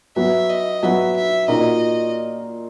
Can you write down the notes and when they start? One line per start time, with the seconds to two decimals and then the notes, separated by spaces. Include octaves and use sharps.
0.16 F#3 B3 F#4 E5
0.50 D#5
0.83 F#3 B3 F#4 E5
1.16 E5
1.48 A#2 A#3 D#4 F#4 A#4 D#5